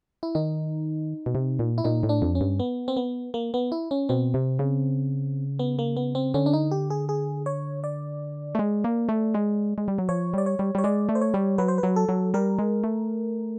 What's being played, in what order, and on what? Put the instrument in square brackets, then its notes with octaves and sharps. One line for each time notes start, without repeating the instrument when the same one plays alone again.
[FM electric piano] E4
[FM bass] D#3 [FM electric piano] D#4
[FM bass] B2
C3
A#2
[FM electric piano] E4
[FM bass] A#2 [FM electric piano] D#4
[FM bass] A2
[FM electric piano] D4
[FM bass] F2
[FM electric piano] C#4
[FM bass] G2
[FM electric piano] B3
C4
B3
A#3
B3
E4
C#4
[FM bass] B2 [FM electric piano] C4
[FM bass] C3
C#3
[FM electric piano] B3
A#3
B3
C4
[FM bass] D3 [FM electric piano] C#4
[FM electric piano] D4
D#4
G4
G#4
G#4
C#5
D5
[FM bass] A3
G#3
A#3
A3
G#3
G#3
G3
F#3
[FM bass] F3 [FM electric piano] C#5
[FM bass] G3 [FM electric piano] D5
[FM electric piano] C#5
[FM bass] G3
[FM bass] G3 [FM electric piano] C#5
[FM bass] G#3 [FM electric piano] D5
[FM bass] A3
[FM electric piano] C5
C#5
[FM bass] G3
[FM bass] F#3 [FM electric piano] B4
[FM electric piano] C5
B4
[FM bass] F#3
[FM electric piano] A4
[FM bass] F#3
[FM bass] G3 [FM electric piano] A#4
[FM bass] G#3
A3